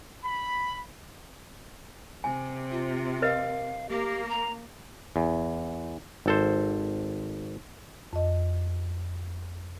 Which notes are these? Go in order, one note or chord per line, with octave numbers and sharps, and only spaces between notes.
B5
C3 G#5
F4
A#4 B4 D#5 F5
A#3 G4
A#5
E2
G#1 A4 C5
F2 D#5